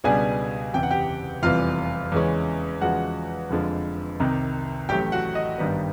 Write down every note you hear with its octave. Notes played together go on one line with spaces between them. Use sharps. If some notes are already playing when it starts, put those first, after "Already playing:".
C#2 B2 G3 B3 D4 G#4 G#5
F#1 E2 C3 E3 G5
F#5
G4 G5
F1 E2 C3 E3 G3 F4 F5
E2 C#3 E3 G#3 C#4
E2 C#3 F3 G#3 F#4 F#5
F1 F2 D3 F3 G#3
C2 C3 D#3
A1 A2 F#3 A3 G4 G5
F#4 F#5
D#5
G#1 G2 D#3 G3 B3